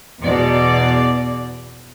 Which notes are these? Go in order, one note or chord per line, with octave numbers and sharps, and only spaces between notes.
E2 B2 D5